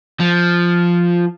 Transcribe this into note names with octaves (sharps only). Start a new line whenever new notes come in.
F3